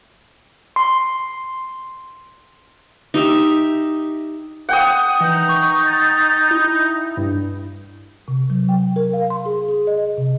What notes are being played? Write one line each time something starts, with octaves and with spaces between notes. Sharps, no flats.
C6
D#4 G4 E5
F#5 G5 D#6
E3 D#4
C#6
A6
E4
G2
C3
F#3
G5
A#4
F5
C6
G#4
G#4
D#5
C3